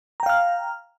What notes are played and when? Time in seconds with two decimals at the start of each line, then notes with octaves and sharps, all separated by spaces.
0.20 A#5
0.23 G5
0.26 F5
0.29 F6